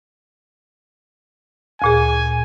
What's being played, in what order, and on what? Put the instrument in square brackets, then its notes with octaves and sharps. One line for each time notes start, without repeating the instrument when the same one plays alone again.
[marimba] D2 A#2 G#4 [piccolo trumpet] G#5